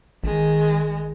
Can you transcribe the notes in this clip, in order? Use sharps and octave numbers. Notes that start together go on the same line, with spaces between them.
A1 D#3 G#3